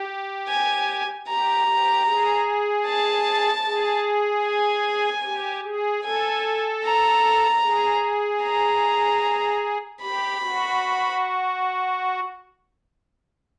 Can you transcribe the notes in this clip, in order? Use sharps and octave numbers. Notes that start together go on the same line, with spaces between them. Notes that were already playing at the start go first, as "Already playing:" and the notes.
Already playing: G4
G#5
G4 A#5
G4
G#4
A5
G#4
G#5
G4
G#4
A4 G#5
A#5
G#4
A#5
G4 B5
F#4